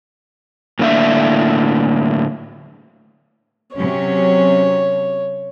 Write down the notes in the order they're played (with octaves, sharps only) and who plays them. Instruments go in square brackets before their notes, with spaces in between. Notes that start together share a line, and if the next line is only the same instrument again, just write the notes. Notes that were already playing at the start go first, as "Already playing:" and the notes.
[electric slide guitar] A2 D3 A#3 D4 E5
[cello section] C3 F#3 C#4 [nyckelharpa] C#5